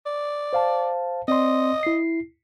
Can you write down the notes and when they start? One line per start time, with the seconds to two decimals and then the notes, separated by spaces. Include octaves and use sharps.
0.06 D5
0.53 C5 F5 A5
1.28 C4 D5 D#5 C6
1.83 E4 C7